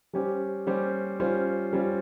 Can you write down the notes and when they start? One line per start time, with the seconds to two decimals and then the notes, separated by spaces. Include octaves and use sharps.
0.13 G3 C#4 G4 C5
0.67 G3 C#4 G4 C5
1.20 G3 C#4 F4 C5
1.73 G3 C#4 F4 C5